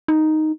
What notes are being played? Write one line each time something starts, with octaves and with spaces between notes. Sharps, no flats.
D#4